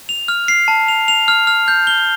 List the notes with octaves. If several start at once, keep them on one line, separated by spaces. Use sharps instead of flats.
F7
F6
C7
A5
F7
F7
F6
F6
G6
G7